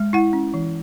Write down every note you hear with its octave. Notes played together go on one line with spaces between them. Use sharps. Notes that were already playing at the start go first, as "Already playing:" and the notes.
Already playing: G#3
E4 F#5
C#4
E3